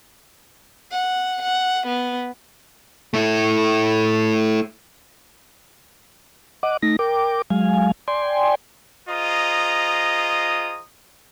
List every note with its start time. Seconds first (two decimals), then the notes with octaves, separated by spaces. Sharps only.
0.92 F#5
1.42 F#5
1.87 B3
3.14 A3 E4
6.63 D#5 F#5 D6
6.82 A3 D#4 A#6
6.99 A#4 G5 D6
7.50 F#3 G#3 F5 G#5
8.08 D5 G5 G#5 C6
9.09 F4 G#4 C5 D#5 A#5 D#6